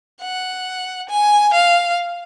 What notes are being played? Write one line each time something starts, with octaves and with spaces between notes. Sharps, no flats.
F#5
G#5
F5